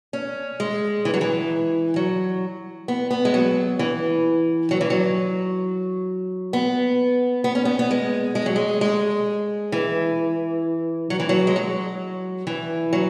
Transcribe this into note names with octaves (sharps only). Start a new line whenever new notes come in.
C#4
G#3
E3
F#3
E3
F#3
B3
B3
G#3
F#3
E3
F#3
E3
F#3
B3
B3
C#4
B3
B3
G#3
G#3
F#3
G#3
G#3
E3
F#3
E3
F#3
G#3
F#3
E3
F#3